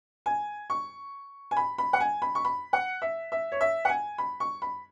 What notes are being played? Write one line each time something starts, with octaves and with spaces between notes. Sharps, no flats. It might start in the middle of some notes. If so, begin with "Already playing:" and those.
G#5
C#6
G#5
B5
B5
F#5
G#5
B5
C#6
B5
F#5
E5
E5
C#5
E5
F#5
G#5
B5
C#6
B5